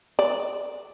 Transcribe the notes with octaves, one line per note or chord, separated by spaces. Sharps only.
D5